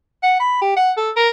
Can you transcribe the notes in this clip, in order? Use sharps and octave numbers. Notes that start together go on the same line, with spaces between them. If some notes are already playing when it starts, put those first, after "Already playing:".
F#5
B5
G4
F#5
A4
A#4